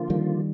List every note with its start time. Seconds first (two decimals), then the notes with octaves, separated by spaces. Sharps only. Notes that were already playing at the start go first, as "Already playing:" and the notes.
Already playing: D3 F3 A#3 F4
0.10 D#3 G3